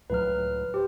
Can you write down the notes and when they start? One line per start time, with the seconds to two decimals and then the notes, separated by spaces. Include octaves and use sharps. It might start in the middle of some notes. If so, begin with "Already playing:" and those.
0.10 C#2 A2 F#3 B4 F6
0.74 G4 C5